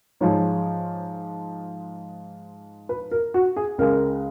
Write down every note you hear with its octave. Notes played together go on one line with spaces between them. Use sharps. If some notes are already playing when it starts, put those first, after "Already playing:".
G#2 F3 G#3 C#5
B4
A#4
F#4
G#4
C#2 C#3 G#3 A#4